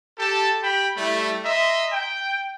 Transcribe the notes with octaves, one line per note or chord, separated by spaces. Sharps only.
G4 A4 A5
G4 G5 B5
G3 A3 E4
D#5 E5 A#5 C6
G5